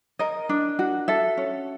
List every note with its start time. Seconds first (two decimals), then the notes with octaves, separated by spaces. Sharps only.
0.19 A#4 D#5
0.49 D4
0.79 F#4
1.08 A4 E5
1.37 C#4